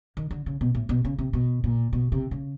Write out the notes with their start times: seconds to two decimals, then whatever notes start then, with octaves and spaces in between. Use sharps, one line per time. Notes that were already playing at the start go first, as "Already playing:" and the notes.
0.17 D#3
0.31 D3
0.46 C#3
0.61 B2
0.75 A2
0.89 B2
1.05 C#3
1.18 C3
1.33 B2
1.64 A#2
1.93 B2
2.12 C3
2.31 C#3